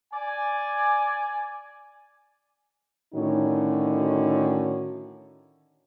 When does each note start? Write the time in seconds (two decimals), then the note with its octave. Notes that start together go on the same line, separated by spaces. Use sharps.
0.14 D5 G#5
3.14 A2 D3 D#3 C#4 D#4 F#4